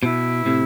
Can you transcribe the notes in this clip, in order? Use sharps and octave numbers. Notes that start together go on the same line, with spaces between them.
B2 E4
A2 C3